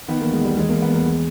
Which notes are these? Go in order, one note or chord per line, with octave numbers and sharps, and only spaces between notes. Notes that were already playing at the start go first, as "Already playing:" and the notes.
D#3 B3
E2 A#3
G#3
D#3 G3
E2 G#3
E2 A#3
B3
E2 A#3
G#3